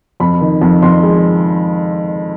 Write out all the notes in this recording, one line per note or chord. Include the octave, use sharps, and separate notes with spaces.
F2 B5
D#3
F2
F2 C6
G#3